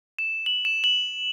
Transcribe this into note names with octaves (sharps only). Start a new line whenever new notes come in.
E7
F#7
E7
F#7